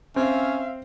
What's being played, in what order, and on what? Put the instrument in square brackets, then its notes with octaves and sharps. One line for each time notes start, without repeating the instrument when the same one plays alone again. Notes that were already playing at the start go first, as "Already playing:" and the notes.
[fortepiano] C4 [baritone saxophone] C#4 [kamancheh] E5 F5